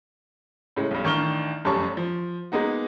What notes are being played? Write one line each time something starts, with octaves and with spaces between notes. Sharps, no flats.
A2 C#3 G#3
B1 G2
A1 D#3 D4 C#6 F6 G7
F1 F#2 G3 C#4 A5 C#6
F3
G#3 A#3 B3 D#4 F#4